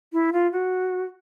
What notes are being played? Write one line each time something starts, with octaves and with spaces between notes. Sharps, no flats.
E4
F4
F#4